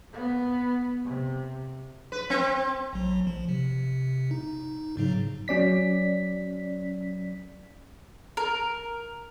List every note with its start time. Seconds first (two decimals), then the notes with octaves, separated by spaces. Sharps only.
0.13 B3
1.05 C3
2.12 B4
2.30 C4
2.93 A#1 F#3
3.27 F3
3.49 C3
4.31 D#4
4.97 G#2 C#3 F#3
5.48 F#3 C#4 D5 B6
8.37 A#4